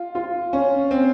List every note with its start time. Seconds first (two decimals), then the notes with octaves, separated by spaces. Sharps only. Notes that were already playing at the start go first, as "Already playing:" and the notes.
Already playing: F4
0.15 F4
0.53 C#4
0.91 C4